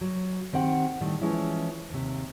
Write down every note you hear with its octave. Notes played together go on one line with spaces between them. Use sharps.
F#3
D#3 C4 G4 F#5 G5
A2 D#3 G3
E3 F3 G#3 C#4 E4
D#2 C3